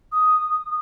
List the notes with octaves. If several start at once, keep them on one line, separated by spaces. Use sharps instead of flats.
D#6